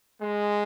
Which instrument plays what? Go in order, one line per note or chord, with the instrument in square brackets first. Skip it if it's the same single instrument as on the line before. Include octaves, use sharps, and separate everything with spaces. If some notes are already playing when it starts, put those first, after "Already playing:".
[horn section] G#3